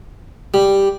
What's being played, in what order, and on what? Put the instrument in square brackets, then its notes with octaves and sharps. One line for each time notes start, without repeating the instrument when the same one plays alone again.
[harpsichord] G3 [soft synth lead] G4